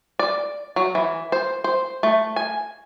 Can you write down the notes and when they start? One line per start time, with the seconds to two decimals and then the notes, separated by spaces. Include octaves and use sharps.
0.19 D5
0.76 F#3
0.95 E3
1.32 C5
1.64 C5
2.03 A3
2.36 G#5